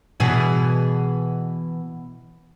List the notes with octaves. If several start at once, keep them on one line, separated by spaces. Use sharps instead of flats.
B2 E3 G#4